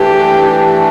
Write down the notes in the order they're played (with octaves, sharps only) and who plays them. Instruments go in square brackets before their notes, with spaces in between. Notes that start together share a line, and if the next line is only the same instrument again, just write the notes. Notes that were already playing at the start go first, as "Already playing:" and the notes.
Already playing: [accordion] E3 A3 D4 [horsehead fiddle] G4